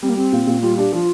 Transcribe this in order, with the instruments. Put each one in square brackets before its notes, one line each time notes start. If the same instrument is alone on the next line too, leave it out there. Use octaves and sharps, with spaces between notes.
[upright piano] G3 [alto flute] C4
[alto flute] A#3
[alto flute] C4 [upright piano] G4
[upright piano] A#2
A#2
[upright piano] G3 [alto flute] F4
[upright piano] D4 [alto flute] G4
[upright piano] F3 [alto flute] F4